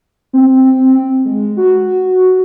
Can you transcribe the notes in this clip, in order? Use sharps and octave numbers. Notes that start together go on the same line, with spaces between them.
C4
G#3
F#4